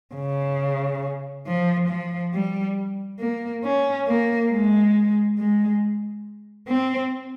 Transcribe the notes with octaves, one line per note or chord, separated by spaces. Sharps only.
C#3
F3
F3
G3
A#3
C#4
A#3
G#3
G#3
C4